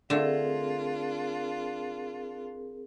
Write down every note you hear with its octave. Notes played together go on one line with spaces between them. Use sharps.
D3 A3 C4 D4 F4 G#4 A#4